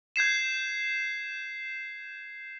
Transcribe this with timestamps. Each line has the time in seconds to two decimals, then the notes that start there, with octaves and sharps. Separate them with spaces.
0.16 G6 G#6 C7 E7